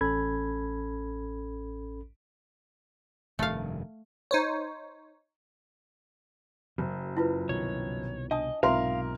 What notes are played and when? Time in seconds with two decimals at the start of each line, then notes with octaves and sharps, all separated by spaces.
0.01 A1 C#4 A4 B5 G#6
3.39 F1 G2 D#3 A3 F5
4.31 D#4 C5 C#5
6.78 F#1 F#2
7.17 E4 F4 B4
7.49 C2 B2 D#3 C#5
8.31 D4 D#5 A5 D#6
8.63 B1 G#2 C3 F4 A#4 E5 F5 C6